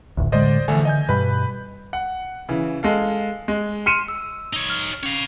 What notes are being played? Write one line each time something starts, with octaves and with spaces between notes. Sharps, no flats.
D#1 A1 D2
A2 D3 G#3 C5 D5 D#5
A#1 D3 E3 A3 G#5
D#5 G#5 G6
G2 B2 B4 B5
F#5
C#3 E3
G#3 A4 F5
G#3
C6 F6 C#7 D#7 E7
E6
D#4 C#5
F6
C#4 C#5 F5